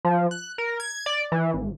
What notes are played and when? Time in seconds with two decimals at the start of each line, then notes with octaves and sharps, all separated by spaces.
0.05 F3
0.31 F#6
0.58 A#4
0.80 G#6
1.06 D5
1.32 E3
1.54 G#1